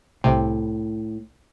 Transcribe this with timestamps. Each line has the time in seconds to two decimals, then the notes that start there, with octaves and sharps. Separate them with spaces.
0.24 C2 A2 C3